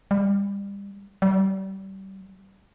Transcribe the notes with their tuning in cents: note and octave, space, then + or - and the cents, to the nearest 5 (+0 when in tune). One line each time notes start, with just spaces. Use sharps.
G3 +30
G3 -30